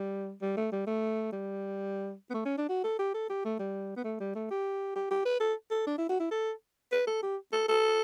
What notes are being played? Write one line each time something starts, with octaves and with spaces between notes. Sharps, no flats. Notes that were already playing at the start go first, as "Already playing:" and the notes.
Already playing: G3
G3
A3
G3
A3
G3
B3
A3
C#4
D4
F#4
A4
G4
A4
G4
A3
G3
B3
A3
G3
A3
G4
G4
G4
B4
A4
A4
D4
E4
F#4
E4
A4
B4
A4
G4
A4
A4